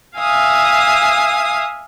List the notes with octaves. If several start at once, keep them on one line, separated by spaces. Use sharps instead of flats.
E5 F5 G#5 D#6